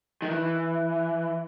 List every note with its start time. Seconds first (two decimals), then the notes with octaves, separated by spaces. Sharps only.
0.22 D#3
0.30 E3